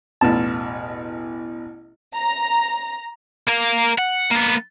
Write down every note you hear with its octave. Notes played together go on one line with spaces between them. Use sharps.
A1 E2 B2 A5
A#5
A#3 A#4
F#5
A#3 B3